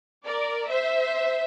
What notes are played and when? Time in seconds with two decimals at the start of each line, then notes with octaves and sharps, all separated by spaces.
0.25 A#4 D5
0.70 C5 E5